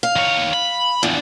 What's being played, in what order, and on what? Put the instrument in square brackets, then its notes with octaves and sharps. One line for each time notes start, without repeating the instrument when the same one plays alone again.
[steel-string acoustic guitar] F5
[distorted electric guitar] D#3 C#5
B5
[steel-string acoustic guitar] E2 [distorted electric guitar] D4 F4